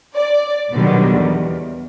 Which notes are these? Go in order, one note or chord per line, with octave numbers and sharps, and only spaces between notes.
D5
B2 D3 D#3 F#3 G3
E2